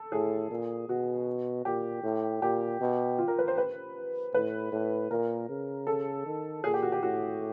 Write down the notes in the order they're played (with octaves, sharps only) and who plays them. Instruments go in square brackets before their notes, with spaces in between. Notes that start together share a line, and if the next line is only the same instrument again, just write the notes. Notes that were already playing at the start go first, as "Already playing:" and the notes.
Already playing: [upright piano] A4
[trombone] A2 [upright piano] G#4
[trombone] A#2
[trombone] B2 [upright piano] F#4
[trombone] A#2 [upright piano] G4
[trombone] A2
[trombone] A#2 [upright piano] G4
[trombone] B2
[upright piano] F4
A#4
B4
C5
B4
[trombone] A2 [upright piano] B4
[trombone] A2
[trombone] A#2 [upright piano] A#4
[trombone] C#3
[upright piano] A4
[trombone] D#3
[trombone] A#2 [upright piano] G#4
[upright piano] G4
F#4
G4
[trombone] A2 [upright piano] F#4